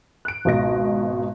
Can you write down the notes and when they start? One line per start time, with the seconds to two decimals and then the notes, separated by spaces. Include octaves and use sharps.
0.25 F#6 D7
0.45 G#1 C#2 B2 D#5 A#6 D7